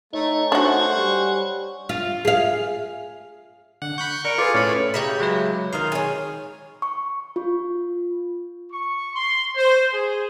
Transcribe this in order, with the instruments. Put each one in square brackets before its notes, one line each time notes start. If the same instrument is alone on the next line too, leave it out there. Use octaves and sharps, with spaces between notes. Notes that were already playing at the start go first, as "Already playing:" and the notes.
[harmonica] A3 [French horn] D#4 [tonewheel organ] C#5 G#5
[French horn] A3 [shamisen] D4 F#4 [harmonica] C5 F#5 C#6
[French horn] G3
[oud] F4
G#4 F5
[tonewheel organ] D3 [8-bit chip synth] F#5
[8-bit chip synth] B5 F#6 G6 [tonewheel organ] C#6
[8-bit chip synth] A#4 [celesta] D5 C#7 D7
[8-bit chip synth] F4 G#4 [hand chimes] A4 B4 A6 [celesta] D6
[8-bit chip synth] A2 B5 [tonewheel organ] C#4 C#5 [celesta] F6 C#7
[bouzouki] C#3 E4 G4 [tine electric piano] D5 A#5 B5
[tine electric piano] F#3 G#3 B4
[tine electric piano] D#3 C6 [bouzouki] F4 A#4
[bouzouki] G#4 C#5
[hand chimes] C#6
F4
[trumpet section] C#6
C6
C5
G#4